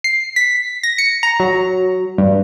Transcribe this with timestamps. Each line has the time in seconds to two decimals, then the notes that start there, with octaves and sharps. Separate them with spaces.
0.04 C7
0.36 B6
0.83 A#6
0.98 C#7
1.23 A#5
1.40 F#3
2.18 G2